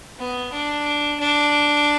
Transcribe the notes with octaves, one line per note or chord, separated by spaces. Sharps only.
B3
D4
D4